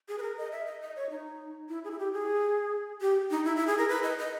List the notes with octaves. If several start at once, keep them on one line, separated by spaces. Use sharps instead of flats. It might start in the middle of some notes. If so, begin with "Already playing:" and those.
G#4
B4
A#4
D#5
E5
D#5
D#5
C#5
D#4
E4
G#4
E4
G4
G#4
G4
D#4
E4
E4
G#4
A#4
B4
D#5
D#5